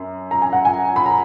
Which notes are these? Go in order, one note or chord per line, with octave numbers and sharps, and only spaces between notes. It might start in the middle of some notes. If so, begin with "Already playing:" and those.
Already playing: F#2
A#5
G#5
F#5
G#5
B5
A#5